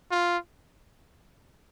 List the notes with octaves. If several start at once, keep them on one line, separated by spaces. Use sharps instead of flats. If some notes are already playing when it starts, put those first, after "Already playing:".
F4